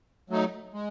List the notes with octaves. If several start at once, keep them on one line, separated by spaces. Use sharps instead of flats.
F#3 A3 D#4
G#3